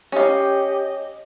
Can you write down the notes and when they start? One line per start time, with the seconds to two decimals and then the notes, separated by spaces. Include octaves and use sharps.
0.12 C#4 G4 D#5 F5